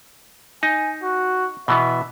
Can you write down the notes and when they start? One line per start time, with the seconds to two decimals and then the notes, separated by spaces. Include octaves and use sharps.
0.63 D#4 G#5
1.03 F#4
1.68 B2 E3 B3 E5